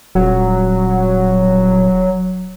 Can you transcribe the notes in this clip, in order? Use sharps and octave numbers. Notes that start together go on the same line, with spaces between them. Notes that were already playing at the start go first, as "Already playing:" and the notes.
D#1 F#3